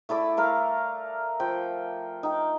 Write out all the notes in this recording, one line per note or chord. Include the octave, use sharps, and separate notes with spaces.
A3 E4 A4 D5
A3 A#4 F5
F3 G5
D#4 G5